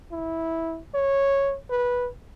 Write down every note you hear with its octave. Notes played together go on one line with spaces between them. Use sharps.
E4
C#5
B4